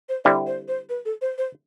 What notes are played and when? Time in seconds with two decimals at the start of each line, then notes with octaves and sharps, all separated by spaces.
0.09 C5
0.25 D3 G3 C4 E4 D5
0.47 C5
0.68 C5
0.89 B4
1.05 A4
1.22 C5
1.38 C5